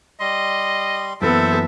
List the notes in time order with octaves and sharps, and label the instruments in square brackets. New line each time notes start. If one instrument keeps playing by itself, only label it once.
[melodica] G3 C6 [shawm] D#5
[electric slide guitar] F#2 E3 A#3 [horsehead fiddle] B3 A4 [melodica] C5 [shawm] E5